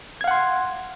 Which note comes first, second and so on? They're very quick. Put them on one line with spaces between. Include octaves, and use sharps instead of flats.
G#6 F5 F#5 C6